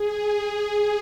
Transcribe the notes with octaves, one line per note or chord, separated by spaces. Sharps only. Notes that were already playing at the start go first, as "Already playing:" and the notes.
Already playing: G#4
G#4